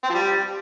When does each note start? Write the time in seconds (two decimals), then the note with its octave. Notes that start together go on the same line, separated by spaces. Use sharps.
0.04 C4
0.09 F3
0.15 G3